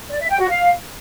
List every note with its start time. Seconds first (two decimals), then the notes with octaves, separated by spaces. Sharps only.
0.10 D5
0.20 E5
0.29 G5
0.39 F#4
0.49 F5